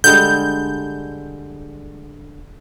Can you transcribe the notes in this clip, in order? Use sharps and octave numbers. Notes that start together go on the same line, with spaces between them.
D3 G3 G#3 G6